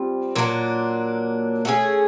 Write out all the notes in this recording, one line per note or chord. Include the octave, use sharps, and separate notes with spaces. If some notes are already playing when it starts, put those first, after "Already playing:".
Already playing: G3 C4 F4
A#2 F#3 A#3 D4
A3 C#4 F4 G#4